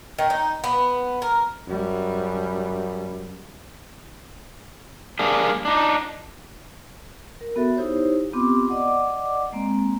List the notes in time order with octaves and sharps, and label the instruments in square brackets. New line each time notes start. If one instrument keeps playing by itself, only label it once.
[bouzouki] D#3
D#4
B3
A#4
[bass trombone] F#2 [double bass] G3
[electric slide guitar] G3 A#3 D4 G#4
D4 D#4
[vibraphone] A#4
B3 F#4 A4 E5
D#4 E4 G4 C5 C#5
B3 C4 F4 G4 C6 D6
D5 D#5 F#5 D6
G#3 A#3 C4